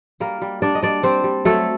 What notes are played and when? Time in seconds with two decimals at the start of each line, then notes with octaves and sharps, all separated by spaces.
0.20 G3 A#3 A#4
0.42 G3
0.62 G3 D4 D5
0.75 D#5
0.82 G3 D4 D5
1.03 G3 C4 C5
1.24 G3
1.45 F#3 A3 A4